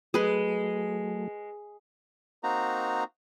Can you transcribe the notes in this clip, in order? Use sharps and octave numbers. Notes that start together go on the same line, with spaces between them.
F#3 G#3 A3 G#4 B4
A#3 C4 D#4 F#4 A#5